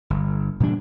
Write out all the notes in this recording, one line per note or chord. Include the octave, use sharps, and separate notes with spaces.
G1
A#2 E3 G3 D4